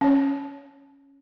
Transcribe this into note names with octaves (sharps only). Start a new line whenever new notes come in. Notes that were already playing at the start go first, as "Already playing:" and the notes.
C#4 C#5